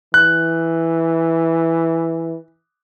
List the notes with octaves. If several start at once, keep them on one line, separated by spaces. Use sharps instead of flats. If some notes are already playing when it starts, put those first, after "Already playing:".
E3 F#6